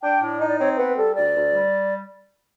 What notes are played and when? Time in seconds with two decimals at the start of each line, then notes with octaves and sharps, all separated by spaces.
0.02 D4 G5
0.22 A2
0.40 D#4 D#5
0.49 D5
0.59 C4 C#5
0.78 B3 B4
0.97 G3 A4
1.16 D2 D5
1.34 D2
1.53 G3